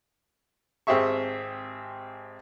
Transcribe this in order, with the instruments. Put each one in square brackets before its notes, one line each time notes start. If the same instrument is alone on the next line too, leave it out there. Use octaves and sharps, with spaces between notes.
[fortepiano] G#1 C4 G4 G#4 E5 C#6